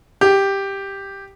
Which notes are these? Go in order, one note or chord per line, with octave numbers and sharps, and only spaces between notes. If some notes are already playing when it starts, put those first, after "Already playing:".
G4